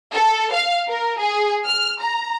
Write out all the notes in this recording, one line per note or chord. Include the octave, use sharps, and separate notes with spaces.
A4
F5
A#4
G#4
F6
A#5